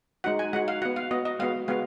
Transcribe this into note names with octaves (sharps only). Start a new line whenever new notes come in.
G#3 D#4 F#4 F#5
G#5
G#3 D#4 F#4 F#5
F5
B3 F#4 F#5
F5
B3 F#4 D#5
D#5
G#3 B3 F#4 F5
G#3 B3 F#4 F5